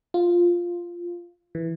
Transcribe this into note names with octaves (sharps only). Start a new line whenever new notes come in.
F4
E3